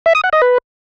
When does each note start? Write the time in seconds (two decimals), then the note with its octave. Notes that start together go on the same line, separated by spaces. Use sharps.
0.06 E5
0.15 D#6
0.24 F#5
0.33 D#5
0.42 B4